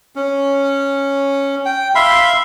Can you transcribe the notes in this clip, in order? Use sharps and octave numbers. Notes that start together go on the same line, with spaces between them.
C#4
G5
E5 F5 B5 C6